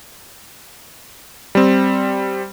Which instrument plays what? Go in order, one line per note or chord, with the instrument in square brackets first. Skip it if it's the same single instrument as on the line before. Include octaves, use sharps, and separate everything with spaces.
[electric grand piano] G3 C4